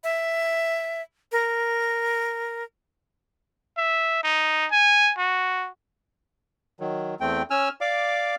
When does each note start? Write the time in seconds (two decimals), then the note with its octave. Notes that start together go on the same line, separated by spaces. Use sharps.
0.04 E5
1.32 A#4
3.78 E5
4.23 D#4
4.72 G#5
5.18 F#4
6.80 D#3 F#3
7.21 E2 A3 C4 G5
7.50 C#4 G#5 E6 F6
7.81 D5 F5 D6